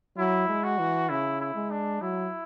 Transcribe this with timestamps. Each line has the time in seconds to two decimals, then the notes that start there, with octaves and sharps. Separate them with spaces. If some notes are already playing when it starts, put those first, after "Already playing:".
0.17 F#3 E4
0.48 G#3
0.64 F#4
0.79 E3
1.09 C#3 E4
1.41 E4
1.55 G#3
1.71 D4
2.01 F#3 E4